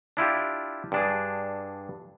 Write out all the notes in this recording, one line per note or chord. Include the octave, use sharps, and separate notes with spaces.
D4 E4 F4 G4
G2 D4 G#4